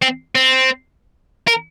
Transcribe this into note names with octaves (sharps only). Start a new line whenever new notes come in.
C4
C4
A#4